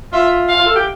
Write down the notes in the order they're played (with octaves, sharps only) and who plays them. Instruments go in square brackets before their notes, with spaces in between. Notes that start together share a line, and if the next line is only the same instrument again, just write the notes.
[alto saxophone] F4 [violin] E5
[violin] F5
[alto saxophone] F4
A4
G4